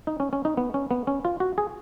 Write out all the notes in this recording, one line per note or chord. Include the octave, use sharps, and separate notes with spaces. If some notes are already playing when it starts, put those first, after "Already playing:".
D#4
C#4
C#4
D#4
B3
C#4
B3
C#4
F4
F#4
G#4